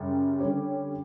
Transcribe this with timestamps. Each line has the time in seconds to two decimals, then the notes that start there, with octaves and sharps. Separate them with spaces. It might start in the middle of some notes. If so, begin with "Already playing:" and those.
Already playing: F#2 C#3 G3
0.39 D3 G3 C#4 G4